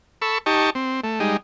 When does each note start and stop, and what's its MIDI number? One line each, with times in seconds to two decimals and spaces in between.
0.22 0.38 69
0.22 0.38 83
0.22 0.38 85
0.22 0.38 88
0.46 0.70 63
0.46 0.70 67
0.46 0.70 81
0.46 0.70 85
0.75 1.01 60
1.04 1.19 57
1.20 1.37 55
1.20 1.37 56
1.20 1.37 63